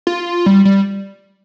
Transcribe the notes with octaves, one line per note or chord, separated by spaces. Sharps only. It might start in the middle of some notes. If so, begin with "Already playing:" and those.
F4
G3
G3